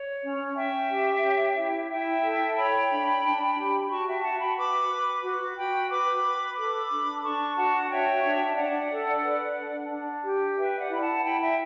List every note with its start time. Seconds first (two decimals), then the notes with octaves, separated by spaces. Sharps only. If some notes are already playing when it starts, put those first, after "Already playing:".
Already playing: C#5
0.24 C#4
0.57 C#4 E5 G5
0.91 G4
1.24 C#5
1.57 E4
1.90 E4 E5 G5
2.24 A4
2.57 C#5 G5 B5
2.91 D4
3.24 D4
3.57 G4
3.90 F#4 A5 C#6
4.07 E5 G5
4.24 F#4 F#5 A5
4.40 G5 B5
4.57 B4 B5 D6
4.90 B4
5.24 F#4
5.57 F#4 G5 B5
5.90 B4 B5 D6
6.24 B4
6.57 A4 B5 D6
6.91 D4
7.24 D4 A5 C#6
7.57 F#4 F#5 A5
7.90 C#5 E5 G5
8.24 D4
8.57 D4 D5 F#5
8.91 A4
9.24 B4
9.57 D4
9.91 D4
10.24 G4
10.57 B4 E5 G5
10.79 D5 F#5
10.90 E4 B5
11.02 F#5 A5
11.24 E4 G5 B5
11.41 E5 G5